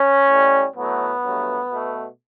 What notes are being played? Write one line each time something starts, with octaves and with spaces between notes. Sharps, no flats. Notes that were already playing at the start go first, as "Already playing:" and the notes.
Already playing: C#4
A2 G3
A2 F#3 A3 B3
G2 F#3 A3
B2 A3